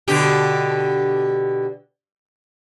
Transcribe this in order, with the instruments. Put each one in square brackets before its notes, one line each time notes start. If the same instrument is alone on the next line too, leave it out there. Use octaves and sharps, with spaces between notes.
[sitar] B2 D3 G4